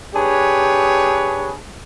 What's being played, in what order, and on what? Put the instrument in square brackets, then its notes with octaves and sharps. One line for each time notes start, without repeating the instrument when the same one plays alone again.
[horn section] D4 G4 G#4 B4 C#5